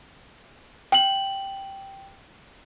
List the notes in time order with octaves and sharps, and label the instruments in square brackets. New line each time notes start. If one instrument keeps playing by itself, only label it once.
[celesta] G5 F#7